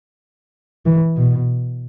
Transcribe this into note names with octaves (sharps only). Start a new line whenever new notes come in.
E3
B2